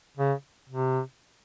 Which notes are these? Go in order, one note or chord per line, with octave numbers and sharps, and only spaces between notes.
C#3
C3